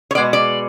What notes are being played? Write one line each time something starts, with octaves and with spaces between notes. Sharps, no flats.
C#5
B2 G#3 B3 D5
D5